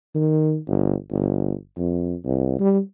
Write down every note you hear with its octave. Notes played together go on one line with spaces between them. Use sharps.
D#3
G1
G1
F2
C2
G3